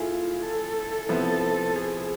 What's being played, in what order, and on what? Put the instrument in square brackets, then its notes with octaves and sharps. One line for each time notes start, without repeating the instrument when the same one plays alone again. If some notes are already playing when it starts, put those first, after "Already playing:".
Already playing: [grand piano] A3 E4 G#4 [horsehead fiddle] F4
[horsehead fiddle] A4
[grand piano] C3 F3 B3 E4 [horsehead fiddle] A4
[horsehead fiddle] G#4